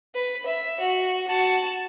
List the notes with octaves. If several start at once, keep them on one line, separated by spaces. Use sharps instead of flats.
B4
E5
F#4
F#4 A5